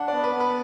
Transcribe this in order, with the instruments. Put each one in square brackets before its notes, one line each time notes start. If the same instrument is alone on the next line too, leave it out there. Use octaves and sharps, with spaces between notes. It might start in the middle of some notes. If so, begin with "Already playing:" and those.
Already playing: [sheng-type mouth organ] D4 [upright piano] F#5
[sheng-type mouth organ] B3 [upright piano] D5
[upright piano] B4
[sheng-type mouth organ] B3 [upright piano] B4